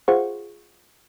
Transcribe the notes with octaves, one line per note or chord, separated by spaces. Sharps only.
F4 G#4 C5 F#5 C#6